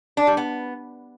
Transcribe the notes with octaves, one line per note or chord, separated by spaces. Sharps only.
D4
G3
B3